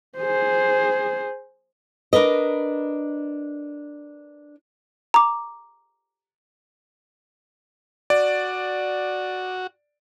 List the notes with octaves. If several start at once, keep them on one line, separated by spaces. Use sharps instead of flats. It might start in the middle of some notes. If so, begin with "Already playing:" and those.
G#4 C5
D4 A#4 B4 D#5
A#5 D6
F#4 D5